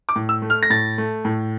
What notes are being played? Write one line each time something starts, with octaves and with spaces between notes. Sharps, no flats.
D6
A2
E6
A3
F6
A#6
A2 A6
A3
A2